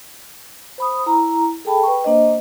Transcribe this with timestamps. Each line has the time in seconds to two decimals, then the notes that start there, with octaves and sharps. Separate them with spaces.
0.78 C5 B5 D#6
1.06 E4 A#5
1.65 G#4 A4 G5 A5 B5
1.83 B4 G5 C#6
2.04 A#3 D4 C5 D#5